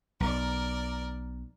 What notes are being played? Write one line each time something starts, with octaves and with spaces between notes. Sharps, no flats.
B1 A#4 D5